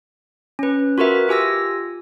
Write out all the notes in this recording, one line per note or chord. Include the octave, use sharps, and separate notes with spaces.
C#4 B4
F4 F#4 A#4 B4 E5
F4 G4 G#5 E6 A#6